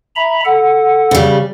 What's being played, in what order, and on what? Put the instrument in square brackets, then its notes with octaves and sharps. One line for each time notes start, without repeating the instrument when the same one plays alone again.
[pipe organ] E5 A#5 B5
A4 F#5
[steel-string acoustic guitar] C#3 G3